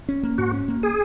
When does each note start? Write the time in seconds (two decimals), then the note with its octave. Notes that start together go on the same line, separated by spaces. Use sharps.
0.09 C#4
0.23 A#3
0.38 G#2 F#4
0.53 C#4
0.68 A#3
0.83 G#4